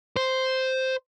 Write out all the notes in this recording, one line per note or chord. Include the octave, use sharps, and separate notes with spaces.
C5